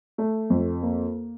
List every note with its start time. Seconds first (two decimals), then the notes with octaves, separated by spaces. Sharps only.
0.18 A3
0.50 F2
0.83 A#3